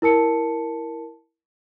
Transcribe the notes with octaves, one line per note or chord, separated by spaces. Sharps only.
E4 A#4 A5 C#7